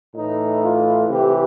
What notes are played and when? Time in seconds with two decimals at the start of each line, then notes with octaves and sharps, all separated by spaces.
0.15 A2 E3 D#4
0.62 F4
1.09 C3 E3 G4